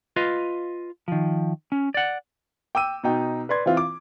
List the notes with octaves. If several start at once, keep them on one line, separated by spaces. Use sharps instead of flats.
F4 B4 D#5 F5
D#3 F3
C#4
D5 F#5
G5 D6 E6 D#7
B2 D#4 G5
B4 D5 C6 G#6
E3 C4 F4
D6